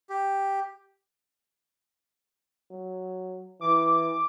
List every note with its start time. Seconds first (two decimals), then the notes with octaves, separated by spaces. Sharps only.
0.10 G4
2.70 F#3
3.61 E3 D6